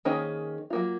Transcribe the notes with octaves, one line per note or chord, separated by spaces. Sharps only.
D#3 A#3 C#4 G#4 C5
F#3 A#3 F4